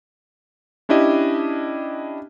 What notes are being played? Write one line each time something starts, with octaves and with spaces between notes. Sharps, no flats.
C#4 D4 E4 G4 D#5